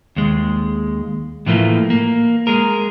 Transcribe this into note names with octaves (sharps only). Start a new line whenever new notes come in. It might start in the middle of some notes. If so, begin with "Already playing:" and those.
D#2 G#3
A2 E3 F3 A3 A#3
A#3
G#3 G#4 A#4